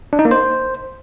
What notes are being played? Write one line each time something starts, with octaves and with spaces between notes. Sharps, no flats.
D4
D#4
A#3
C5